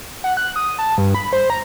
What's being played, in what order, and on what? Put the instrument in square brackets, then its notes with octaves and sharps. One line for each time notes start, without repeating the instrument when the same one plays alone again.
[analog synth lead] F#5
F#6
D#6
A5
G2
B5
C5
A#5